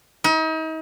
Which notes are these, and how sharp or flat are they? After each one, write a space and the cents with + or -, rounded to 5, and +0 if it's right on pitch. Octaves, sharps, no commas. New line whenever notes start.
D#4 +40